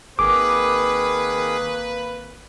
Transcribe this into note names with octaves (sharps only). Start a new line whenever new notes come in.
G#1 D#3 A#3 G#4 B4 D6